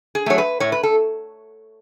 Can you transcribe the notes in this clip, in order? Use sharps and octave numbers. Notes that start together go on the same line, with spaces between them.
G#4
F#3 A3 C#5
B4
A2 C#5
B4
A4